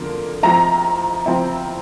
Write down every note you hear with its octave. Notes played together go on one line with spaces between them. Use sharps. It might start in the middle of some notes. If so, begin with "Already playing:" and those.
Already playing: D3 F3 A#3
F3 C4 E4 A#5
F3 C4 E4